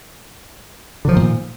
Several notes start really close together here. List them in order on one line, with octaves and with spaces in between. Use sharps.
D3 F3 D#3 A#2